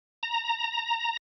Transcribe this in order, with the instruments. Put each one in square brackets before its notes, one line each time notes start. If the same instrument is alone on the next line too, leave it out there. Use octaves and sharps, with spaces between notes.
[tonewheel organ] A#5